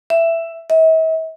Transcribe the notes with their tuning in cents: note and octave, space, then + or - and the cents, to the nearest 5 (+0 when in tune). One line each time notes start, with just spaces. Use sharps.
E5 +10
E5 -45